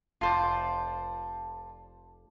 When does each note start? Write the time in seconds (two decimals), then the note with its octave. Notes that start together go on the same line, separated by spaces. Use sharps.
0.21 F1 F4 C5 D5 A5